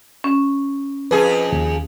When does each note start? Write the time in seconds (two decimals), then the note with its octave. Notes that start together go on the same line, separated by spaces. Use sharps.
0.24 C#4
1.11 F2 G#4 B4
1.52 D#2